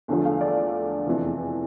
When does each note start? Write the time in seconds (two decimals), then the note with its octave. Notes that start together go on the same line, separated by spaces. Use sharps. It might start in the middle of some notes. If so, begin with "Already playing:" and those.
0.08 E2 D3 F3 A3
0.25 F5
0.41 D5
1.07 F1 E2 E3